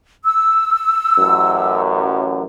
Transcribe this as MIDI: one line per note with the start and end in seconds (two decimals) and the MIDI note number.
0.24 1.79 88
1.19 2.43 33
1.19 2.43 42